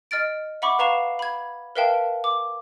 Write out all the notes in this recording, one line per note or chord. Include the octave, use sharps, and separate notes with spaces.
D#5 F6 A6 D7
E5 F#5 B5 C#6 D6
B4 F5 A#5 C#6 C7 E7
B5 G#6
A#4 B4 E5 F5 G5 A5
D6